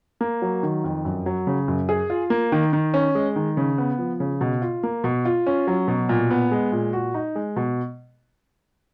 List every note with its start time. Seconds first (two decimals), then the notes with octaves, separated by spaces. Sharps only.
0.21 A#3
0.42 F#3
0.63 D#3
0.84 F2
1.05 F#2
1.26 F#3
1.47 C#3
1.68 F#2
1.89 G#4
2.10 F4
2.30 A#3
2.52 D#3
2.73 D#3
2.94 C#4
3.15 G#3
3.36 D#3
3.57 C#3
3.78 B3
3.99 F3
4.20 C#3
4.41 B2
4.62 F4
4.83 A#3
5.04 B2
5.25 F4
5.47 C#4
5.67 F#3
5.88 B2
6.09 A#2
6.31 B3
6.51 G#3
6.72 A#2
6.93 F#4
7.14 D#4
7.35 G#3
7.56 B2